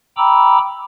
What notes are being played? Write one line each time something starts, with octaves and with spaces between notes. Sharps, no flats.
G5 A#5 B5 D6 E6